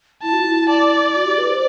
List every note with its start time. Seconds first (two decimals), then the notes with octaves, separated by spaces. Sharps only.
0.23 E4 A5
0.33 F#4
0.42 E4
0.69 D5
1.16 F#4
1.27 G4
1.38 B4
1.50 C5